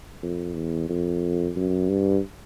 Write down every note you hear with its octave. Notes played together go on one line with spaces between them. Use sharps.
F2
E2
F2
F#2
G2